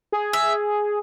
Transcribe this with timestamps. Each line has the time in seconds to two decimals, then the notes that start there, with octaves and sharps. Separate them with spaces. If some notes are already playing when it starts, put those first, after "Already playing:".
0.12 G#4
0.33 E5